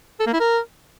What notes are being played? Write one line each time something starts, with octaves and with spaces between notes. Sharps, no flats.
A4
A#3
E4
A#4